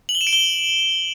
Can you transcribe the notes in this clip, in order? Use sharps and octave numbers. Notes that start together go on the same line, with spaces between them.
F#7
G7
E7
D7
G7